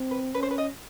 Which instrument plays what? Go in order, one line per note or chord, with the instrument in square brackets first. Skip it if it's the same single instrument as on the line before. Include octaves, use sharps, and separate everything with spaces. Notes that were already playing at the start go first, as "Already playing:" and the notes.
Already playing: [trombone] C4
[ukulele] B4
[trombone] C#4 [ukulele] B4
[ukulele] C5
B4
D#5